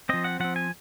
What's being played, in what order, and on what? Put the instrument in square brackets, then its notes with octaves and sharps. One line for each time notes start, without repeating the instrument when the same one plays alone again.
[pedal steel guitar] F3 C4 D#5
F#5
F3 C4 F#5
G#5